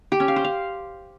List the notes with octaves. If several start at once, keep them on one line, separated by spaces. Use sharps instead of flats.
G4
C#4
F5
C5
F5